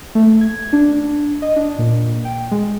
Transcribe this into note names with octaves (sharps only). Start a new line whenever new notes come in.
A3
G#6
D4
D#5
D4
A#2
G5
G#3